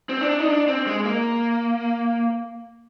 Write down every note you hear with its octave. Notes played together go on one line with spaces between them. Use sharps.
C4
D4
D#4
D4
C4
G#3
A#3